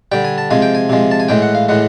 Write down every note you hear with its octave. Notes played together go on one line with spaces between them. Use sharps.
D3 G3 G5
G#5
A5
C3 F3 G#3 G#5
G5
G#5
C3 F3 G#3
A5
G#5
A2 E3 G#3 G5
F#5
F5
A2 E3 G#3 F#5